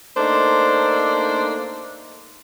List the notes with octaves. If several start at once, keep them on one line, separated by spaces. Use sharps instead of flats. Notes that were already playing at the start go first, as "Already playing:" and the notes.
A3 A#3 D4 D#4 C5